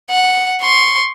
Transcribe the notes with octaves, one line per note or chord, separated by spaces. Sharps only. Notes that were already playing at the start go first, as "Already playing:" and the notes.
F#5
C6 C#6